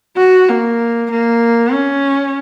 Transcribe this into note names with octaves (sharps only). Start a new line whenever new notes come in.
F#4
A#3
A#3
C#4